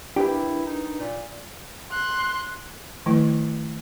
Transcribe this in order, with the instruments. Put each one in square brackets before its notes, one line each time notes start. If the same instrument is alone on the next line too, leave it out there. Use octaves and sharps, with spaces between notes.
[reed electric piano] D4 A#4 B4 [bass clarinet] E4 [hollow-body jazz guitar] G4
[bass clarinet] D#4
A#2
[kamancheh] C6 F#6
[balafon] D#3 F3 A3 E4 B4